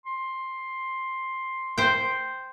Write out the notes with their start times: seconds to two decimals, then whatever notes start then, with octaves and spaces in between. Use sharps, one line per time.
0.06 C6
1.78 C5 G5